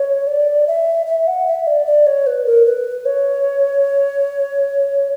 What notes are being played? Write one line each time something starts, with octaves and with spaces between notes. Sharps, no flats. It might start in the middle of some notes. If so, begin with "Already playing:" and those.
Already playing: C#5
D5
E5
E5
F#5
E5
D5
D5
C#5
B4
A#4
B4
C#5